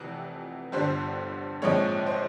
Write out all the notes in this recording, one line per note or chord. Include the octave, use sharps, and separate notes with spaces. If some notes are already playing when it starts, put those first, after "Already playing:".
Already playing: F1 F2 C3 E3 F#5
G1 G2 D3 G3 C5
A#1 G#2 F3 G#3 C4 C#5
C5